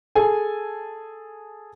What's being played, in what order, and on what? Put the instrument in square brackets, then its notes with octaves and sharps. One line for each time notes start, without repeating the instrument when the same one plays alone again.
[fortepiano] G#4 A4 G#5